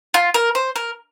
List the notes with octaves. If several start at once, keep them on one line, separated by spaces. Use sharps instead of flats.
F4
A#4
C5
A#4